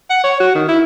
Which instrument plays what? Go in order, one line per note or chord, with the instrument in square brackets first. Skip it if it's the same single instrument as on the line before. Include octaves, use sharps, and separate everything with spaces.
[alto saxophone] F#5
C#5
F#4
D#3
E4